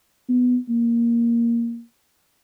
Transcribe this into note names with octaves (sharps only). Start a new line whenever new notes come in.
B3
A#3